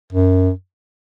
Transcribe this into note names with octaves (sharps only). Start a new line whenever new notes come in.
F#2